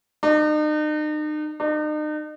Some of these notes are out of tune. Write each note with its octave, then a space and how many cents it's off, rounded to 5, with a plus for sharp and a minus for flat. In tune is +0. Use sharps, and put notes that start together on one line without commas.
D#4 -40
D#4 -40